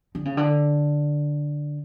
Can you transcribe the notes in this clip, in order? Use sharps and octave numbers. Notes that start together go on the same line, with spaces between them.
D3
C#3
D3